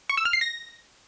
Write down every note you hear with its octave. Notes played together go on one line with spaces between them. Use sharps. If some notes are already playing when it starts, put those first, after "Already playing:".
C#6
E6
F6
C7
A#6